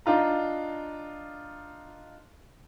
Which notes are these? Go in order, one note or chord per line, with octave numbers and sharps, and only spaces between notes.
D4 D#4 F4 A#5